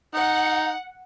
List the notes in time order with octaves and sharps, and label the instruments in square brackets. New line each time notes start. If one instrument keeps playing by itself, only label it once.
[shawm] D#4 [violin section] F#5